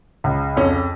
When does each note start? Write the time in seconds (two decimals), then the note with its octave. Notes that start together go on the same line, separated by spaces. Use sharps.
0.24 C#2
0.56 F2 C#4